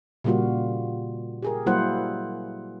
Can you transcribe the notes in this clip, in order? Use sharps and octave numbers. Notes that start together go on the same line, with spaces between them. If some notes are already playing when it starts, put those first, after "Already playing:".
A#2 C#3 G3 A#3 F4 F#4
G4 G#4 A#4
F#3 G3 A#3 E4 C5 F#5